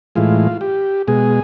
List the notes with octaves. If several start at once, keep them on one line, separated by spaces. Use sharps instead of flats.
A2 E3 G#3 F4
G4
B2 G#3 G#4